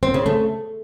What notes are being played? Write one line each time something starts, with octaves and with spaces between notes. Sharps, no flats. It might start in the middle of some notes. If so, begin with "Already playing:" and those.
C4
C#3
A3